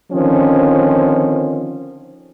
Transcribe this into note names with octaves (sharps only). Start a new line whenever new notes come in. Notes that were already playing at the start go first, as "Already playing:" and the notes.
D3 D#3 F3 C4 C#4